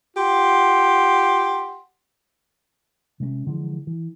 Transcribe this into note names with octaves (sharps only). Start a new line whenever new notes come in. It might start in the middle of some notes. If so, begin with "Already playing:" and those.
F4 G4 F#5 C6
C3 G#3 A#3 C#4
D3 E3 F3 G#3
E3